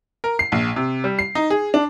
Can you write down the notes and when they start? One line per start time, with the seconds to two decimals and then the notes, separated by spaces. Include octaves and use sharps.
0.24 A#4
0.39 C7
0.52 A#1
0.76 C3
1.04 G3
1.19 C7
1.35 D#4
1.50 G#4
1.74 D4